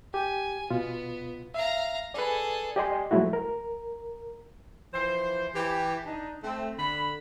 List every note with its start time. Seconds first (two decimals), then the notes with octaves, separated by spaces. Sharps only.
0.14 G4 G#5
0.71 B2 B3 F4
1.54 E5 F5 A#5
2.14 G#4 A4 B4 D5
2.76 G4 D5 D#5 G#5 C6
3.11 F3 F#3 G#3 A3 E4 F#4
3.33 A#4
4.93 E3 F3 C5
5.54 E3 G4
6.05 D4 D#4
6.43 A3 C4
6.78 D3 B5